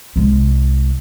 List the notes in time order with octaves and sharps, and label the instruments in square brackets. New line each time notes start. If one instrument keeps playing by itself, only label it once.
[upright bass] C2 G#3